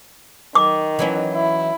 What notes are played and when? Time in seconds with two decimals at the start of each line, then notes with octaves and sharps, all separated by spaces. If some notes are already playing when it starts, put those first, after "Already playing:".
0.55 D#3 D6
0.99 E3 F#3 C#4
1.33 E4